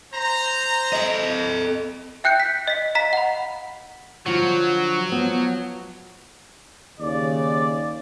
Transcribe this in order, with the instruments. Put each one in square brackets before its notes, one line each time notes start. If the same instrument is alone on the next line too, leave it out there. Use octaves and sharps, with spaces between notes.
[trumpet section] C5 A#5
[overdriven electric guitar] A4 D#5
[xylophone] E5 G5 F#6 G6 C#7
B6
D#5 B6
D#5 F5 A#5 B6
F#5 B5
[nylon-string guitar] D3 F3 F4 [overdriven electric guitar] F#3
[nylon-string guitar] F3 B3
[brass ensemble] D#2 C#3 D5